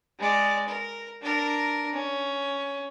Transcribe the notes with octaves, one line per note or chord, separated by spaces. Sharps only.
G#3 D5
A#4
D4 A#4
C#4